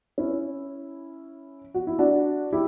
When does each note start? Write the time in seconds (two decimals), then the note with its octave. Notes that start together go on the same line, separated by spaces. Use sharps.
0.18 C#4 E4
1.74 F#4
1.87 E4
1.99 D4 F#4
2.52 E4 G4